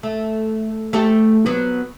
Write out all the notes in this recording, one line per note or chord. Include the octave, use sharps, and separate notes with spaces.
A3
A3 G4 A4
F#3 B3